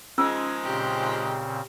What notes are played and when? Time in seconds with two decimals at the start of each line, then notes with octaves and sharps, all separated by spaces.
0.18 D#3 F3 G#3 C#4 F4 G#5 E6
0.64 A#2 C#3 C4 G4